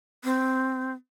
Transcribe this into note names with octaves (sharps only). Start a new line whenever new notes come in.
C4